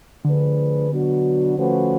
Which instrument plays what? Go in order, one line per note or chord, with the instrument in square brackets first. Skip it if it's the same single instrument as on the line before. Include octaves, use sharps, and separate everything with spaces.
[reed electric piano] D3 [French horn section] F3 A3 D4 G#4 B4
[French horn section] B2 F#3 B3 D4 F#4
F3 A3 C#4 F#4 B4